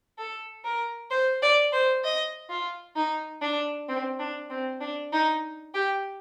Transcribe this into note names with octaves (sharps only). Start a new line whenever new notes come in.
A4
A#4
C5
D5
C5
D#5
F4
D#4
D4
C4
D4
C4
D4
D#4
G4